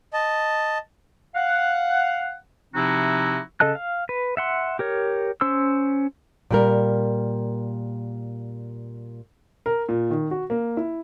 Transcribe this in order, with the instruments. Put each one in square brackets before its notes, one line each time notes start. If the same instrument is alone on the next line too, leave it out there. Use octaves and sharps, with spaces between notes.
[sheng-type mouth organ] D#5 A5
[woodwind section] F5 F#5
C3 F3 C4 D#4 E4 F#4
[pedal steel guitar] C#3 A4 D#5 A5 F#6
F5
B4
E5 F#5 C6
G4 A#4 C#5
C#4 C5 C6 E6
[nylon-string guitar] A#2 G3 A#4
[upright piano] A#4
A#2
D#3
F#4
A#3
E4